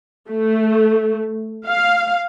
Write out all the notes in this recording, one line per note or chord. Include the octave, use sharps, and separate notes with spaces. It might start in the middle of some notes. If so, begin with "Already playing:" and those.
A3
F5